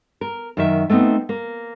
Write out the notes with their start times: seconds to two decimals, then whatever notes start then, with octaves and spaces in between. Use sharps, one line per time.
0.21 A#4
0.57 F#2 D#3 E5
0.90 A3 B3 C4 D4 D#4
1.29 A#3